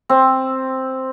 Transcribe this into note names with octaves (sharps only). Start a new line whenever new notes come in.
C4